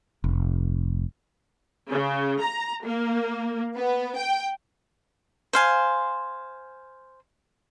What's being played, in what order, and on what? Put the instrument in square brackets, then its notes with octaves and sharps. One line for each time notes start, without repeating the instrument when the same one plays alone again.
[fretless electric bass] F1
[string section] C#3
A#5
A#3
B3
G5
[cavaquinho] C5 F5 G#5